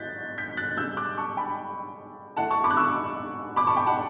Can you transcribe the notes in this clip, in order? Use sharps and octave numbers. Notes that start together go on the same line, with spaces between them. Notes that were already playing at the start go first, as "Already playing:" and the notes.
Already playing: E3 F#6 G6 A6 B6
G6 B6
F#6 A6
C#3 G3 D4 E6 G6
D6 F#6
A5 C#6
G5 B5
D3 A3 E4 F#5 A5
A5 C#6
B5 D6
F#6
C#6 E6
B5 D6
A5 C#6
G5 B5
F#5 A5